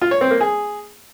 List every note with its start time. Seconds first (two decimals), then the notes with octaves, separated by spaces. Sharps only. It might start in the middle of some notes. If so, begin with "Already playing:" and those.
0.02 F4
0.11 C#5
0.21 C4
0.31 A#3
0.41 G#4